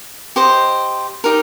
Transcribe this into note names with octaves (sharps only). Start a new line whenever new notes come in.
G4 C5 D#5
D#4 G4 A#4